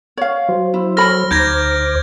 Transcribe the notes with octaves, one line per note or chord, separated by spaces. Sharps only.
C#5 F5
F#3 C5
E4
A4 C#5 B5 F6 A#6
D2 D#4 C5 D6 G6 G#6 A#6